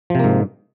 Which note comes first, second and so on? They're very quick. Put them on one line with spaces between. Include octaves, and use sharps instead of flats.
F3 C3 A#3 G#2